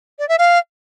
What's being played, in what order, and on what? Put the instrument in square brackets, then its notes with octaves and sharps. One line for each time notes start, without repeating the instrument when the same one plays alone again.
[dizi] D5
E5
F5